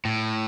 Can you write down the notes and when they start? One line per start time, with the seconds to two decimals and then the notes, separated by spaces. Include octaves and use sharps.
0.05 A2